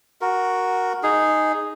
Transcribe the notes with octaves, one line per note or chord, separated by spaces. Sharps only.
F#4 A#4
D#4 G#4